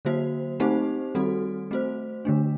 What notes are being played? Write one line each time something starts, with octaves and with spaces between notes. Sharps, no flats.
D3 F#3 A#3 F#4 C5
A3 C4 D#4 G4 C5
D#3 G3 C4 F#4 A4
A3 C4 F#4 C5
D3 A3 D4